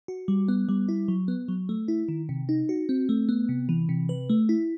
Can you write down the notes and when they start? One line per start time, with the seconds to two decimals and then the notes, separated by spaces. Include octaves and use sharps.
0.08 F#4
0.28 G3
0.48 B3
0.69 G3
0.89 E4
1.08 F#3
1.28 B3
1.48 F#3
1.69 A3
1.88 E4
2.08 D#3
2.29 C3
2.49 D#4
2.69 F#4
2.89 C4
3.09 A3
3.29 B3
3.49 C3
3.69 E3
3.89 C3
4.09 B4
4.30 A3
4.49 E4